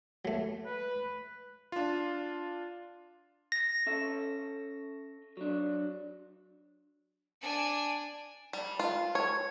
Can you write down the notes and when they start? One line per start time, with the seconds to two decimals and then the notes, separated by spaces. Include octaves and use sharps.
0.25 F#3 A3
0.66 B4
1.72 D4 F4
3.52 A#6
3.86 C#4 A4 E5
5.37 F#3 D4
7.41 D4 G#5
8.53 G3
8.79 F4
9.15 C#5